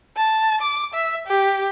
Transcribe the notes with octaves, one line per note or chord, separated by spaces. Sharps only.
A5
D6
E5
G4